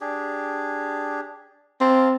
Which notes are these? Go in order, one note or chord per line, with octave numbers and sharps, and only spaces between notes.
D4 G4 G#4
C4 F5 A5